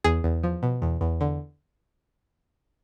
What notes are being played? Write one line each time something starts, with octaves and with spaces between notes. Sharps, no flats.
E2 G#4
E2
F3
B2
E2
E2
D3